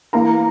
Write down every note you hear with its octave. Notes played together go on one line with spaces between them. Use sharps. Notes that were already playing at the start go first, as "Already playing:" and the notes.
E3 A#3 A#5